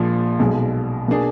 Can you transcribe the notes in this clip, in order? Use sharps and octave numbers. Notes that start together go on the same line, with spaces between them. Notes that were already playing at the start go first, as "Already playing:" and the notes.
Already playing: A#1 A#2 F3 G#3
B1 B2 G#3
B2 A#3 D4 G#4